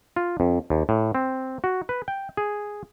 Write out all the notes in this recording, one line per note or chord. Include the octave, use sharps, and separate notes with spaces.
F4
F2
D#2
A2
C4
F#4
B4
G5
G#4